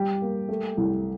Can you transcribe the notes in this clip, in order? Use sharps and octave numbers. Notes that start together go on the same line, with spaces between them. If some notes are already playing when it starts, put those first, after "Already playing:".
Already playing: G3 G4
A#3
A3
C2